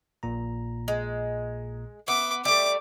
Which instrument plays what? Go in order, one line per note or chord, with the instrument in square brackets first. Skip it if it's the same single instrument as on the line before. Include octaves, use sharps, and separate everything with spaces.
[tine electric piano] A#1 A#2 A#5
[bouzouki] G#3
[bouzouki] B3 [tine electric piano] E5 [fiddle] D6
[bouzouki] G3 A3 [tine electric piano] E5 [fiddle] D6